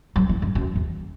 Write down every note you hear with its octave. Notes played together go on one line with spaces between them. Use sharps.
F#3
E3
G2
F#2
E2